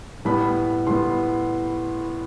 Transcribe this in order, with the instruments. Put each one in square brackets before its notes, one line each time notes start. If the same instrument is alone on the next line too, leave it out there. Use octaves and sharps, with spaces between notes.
[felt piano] A2 G3 B3 B5
A2 G3 B3 C6